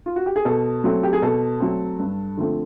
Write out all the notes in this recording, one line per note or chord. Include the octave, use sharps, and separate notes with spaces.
F4
F#4
G4
G#4
B2 A4
F#3 A3 C4
G4
G#4
B2 A4
F#3 A3 C4
G2
D3 F3 A3 C4